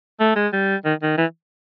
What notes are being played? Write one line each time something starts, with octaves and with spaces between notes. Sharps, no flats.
A3
G#3
G3
D#3
D#3
E3